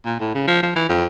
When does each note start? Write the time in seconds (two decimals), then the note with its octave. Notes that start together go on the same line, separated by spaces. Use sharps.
0.06 A#2
0.20 A2
0.34 C#3
0.47 F3
0.63 F3
0.76 E3
0.89 F2